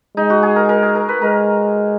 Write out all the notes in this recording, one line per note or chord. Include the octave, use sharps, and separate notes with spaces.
G#3 D#4
F#4
G#4
A#4
A#4
G#4
A#4
B4
G#3 A#4